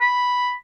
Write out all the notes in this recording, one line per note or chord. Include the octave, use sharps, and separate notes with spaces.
B5